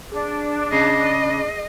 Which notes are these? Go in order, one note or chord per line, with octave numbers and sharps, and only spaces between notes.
D4 G#4
C#3 G#4 D#5 C7